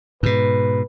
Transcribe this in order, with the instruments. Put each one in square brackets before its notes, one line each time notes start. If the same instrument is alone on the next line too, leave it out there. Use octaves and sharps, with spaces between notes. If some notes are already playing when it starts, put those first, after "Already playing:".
[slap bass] G#2 B2 [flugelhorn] B4